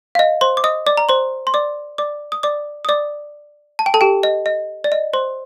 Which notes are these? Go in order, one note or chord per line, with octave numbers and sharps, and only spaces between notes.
F5
D#5
C5 C6
D6
D#5 D#6
D5 D6
A#5
C5 C6
C6
D5 D6
D5 D6
D#6
D5 D6
D#6
D5 D6
A5
G5
A4 A5
G4 G5
D#5
D#5
D5
D#5
C5 C6